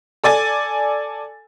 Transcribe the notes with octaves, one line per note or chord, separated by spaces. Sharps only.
A4 D5 G#5 A6